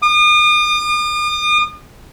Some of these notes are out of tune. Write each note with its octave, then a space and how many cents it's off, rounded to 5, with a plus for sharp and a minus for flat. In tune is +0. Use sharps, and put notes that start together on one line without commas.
D#6 -45